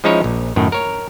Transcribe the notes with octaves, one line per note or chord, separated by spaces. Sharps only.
F3 G#3 C#4 D#4 E4 C#5
A#1
F#2 A2 D#3
A#4 C#5